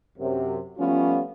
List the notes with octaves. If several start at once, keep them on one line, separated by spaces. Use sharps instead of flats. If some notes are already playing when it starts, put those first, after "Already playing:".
F#2 C3
F3 G3 A3 B3 C#4 F4